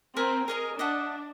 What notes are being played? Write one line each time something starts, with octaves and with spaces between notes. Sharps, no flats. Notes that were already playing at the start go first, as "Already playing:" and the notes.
C4 A#4 G#5 B5
G#4 A#4 D#5 G#5
D4 D#5 E5 F#5